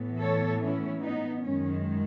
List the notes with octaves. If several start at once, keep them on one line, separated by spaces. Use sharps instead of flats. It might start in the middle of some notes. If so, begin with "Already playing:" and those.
Already playing: A2 E3 B3
A4 C#5
C#4 E4
B3 D#4
F#2 D#3 G#3 C#4